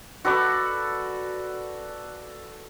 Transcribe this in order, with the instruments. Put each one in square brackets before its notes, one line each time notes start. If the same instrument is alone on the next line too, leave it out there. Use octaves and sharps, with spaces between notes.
[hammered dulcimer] F#4 A4 B4 D5